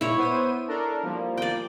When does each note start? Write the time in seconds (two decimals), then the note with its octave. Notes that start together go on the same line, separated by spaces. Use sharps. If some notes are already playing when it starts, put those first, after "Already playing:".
0.01 A#2 G#3 E4 C#5
0.17 B3 C5 D#7
0.68 D4 A4 A#4
1.03 F3 G3 A#3
1.38 D5 G5